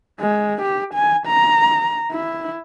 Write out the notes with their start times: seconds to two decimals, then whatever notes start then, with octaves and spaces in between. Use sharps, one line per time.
0.20 G#3
0.62 G4
0.94 G#5
1.27 A#5
2.12 E4